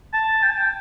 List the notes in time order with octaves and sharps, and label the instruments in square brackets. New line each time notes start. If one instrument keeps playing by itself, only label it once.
[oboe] A5
G5
A5
G5